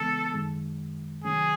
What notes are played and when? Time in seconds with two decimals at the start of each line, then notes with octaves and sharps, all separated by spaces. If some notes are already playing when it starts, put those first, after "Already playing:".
Already playing: C#3 E3 G#3 B3 A4
0.34 F#2 D#3 G#3
1.24 C3 D#3 F#3 A3 C#4 G#4